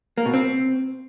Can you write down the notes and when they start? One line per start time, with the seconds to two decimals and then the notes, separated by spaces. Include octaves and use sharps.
0.18 A#3
0.26 B2
0.34 C4